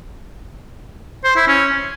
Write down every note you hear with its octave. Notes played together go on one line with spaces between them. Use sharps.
C5
E4
C#4